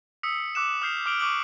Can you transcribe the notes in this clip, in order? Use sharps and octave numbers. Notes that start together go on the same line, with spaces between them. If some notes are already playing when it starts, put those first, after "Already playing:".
D#6 E6 B6 C#7
D6 E6 F#6 C#7 E7
D#6 F6 G6 C7 F7
D6 F6 D7 F7 F#7
C#6 D6 F#6 F#7